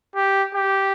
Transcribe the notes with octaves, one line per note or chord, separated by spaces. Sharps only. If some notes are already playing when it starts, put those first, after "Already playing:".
G4
G4